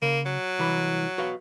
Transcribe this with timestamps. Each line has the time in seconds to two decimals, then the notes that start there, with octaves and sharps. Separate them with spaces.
0.02 C#3 A#3
0.26 F#3
0.59 C2 E3 B5
1.18 F#4 B4 F5